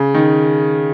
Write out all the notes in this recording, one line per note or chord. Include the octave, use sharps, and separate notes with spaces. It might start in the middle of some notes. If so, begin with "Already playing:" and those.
Already playing: C#3
D#3